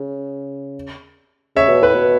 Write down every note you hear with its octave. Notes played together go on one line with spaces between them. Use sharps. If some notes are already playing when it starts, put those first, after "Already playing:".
Already playing: C#3
C#3 C#5 E5
B2
A2 B4
B2